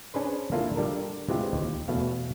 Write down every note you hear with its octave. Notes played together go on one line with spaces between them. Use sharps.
C#4 D4 G#4 B4 C5
A#3 D4 E4 F4 A4
D3 G3 D4 A4 A#4
C3 E3 G#3 F4 G4
D#2
E2 B2 A3 F5